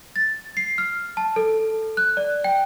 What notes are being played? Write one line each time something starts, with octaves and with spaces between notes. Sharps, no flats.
A6
C7
F6
A5
A4
F#6
D5
G5